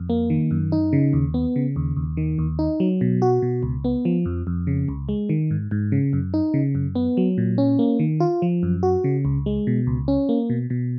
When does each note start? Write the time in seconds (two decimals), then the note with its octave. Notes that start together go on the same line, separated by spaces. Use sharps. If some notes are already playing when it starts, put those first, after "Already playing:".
Already playing: F2
0.10 A#3
0.30 D#3
0.51 F#2
0.72 D#4
0.93 C#3
1.13 D#2
1.34 B3
1.56 C#3
1.76 D#2
1.97 D#2
2.17 D#3
2.39 D#2
2.59 D#4
2.80 F#3
3.01 B2
3.22 F#4
3.42 B2
3.63 C#2
3.84 B3
4.05 F3
4.26 F2
4.47 F2
4.67 C#3
4.88 C#2
5.09 G#3
5.29 D#3
5.51 G#2
5.71 G#2
5.92 C#3
6.13 F#2
6.34 D#4
6.54 C#3
6.75 F#2
6.95 B3
7.17 F#3
7.38 A#2
7.58 C#4
7.79 A#3
7.99 D#3
8.20 F4
8.42 F3
8.63 F#2
8.83 F#4
9.04 C#3
9.25 C#2
9.46 G#3
9.67 B2
9.87 C#2
10.08 C#4
10.29 A#3
10.50 B2
10.70 B2